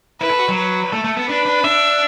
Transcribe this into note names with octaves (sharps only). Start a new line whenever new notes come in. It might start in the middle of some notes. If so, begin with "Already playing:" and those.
E4 B4
A4
F#4
F#3
B4
A3 A4
A3
B3
D4 B4
D4
D4 E5